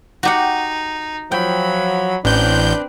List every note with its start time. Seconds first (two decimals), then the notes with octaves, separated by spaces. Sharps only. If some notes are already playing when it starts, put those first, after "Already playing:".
0.23 D#4 F#4 G4 F#5
1.32 F3 F#3 G5 B5
2.25 A1 C4 D4 B4 G6